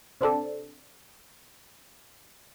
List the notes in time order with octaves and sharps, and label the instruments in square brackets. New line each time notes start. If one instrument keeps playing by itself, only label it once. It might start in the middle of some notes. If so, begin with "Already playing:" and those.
[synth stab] C3 C4 D4 A4